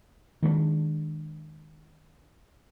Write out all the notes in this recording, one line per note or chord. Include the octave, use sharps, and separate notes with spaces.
D#3 G#3 A3 D4